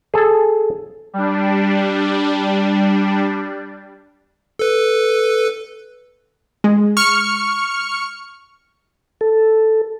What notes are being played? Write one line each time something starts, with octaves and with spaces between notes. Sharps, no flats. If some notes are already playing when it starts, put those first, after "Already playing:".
G#4 A4
G3 D4
A4 B4
G#3
C#6 F6 C#7
A4